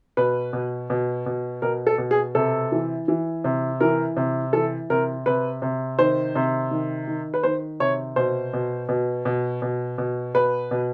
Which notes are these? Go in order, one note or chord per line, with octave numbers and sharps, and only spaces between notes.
B2 B4
B2
B2
B2
B2 A#4
A4
B2
G#4
C3 A4
E3
E3
C3
E3 A#4
C3
E3 A4
C3 A#4
C3 B4
C3
D#3 C5
C3
D#3
D#3
B4
D#3 C5
C3 C#5
B2 C5
B2
B2
B2
B2
B2
B2 B4
B2